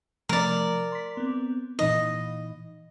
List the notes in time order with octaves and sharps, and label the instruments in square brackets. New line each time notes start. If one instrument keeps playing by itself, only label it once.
[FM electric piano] C3 F3 A3 [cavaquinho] A#4 D5
[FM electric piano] C6 B6
B3 C4
[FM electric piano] A#2 E3 D#4 [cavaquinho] D#5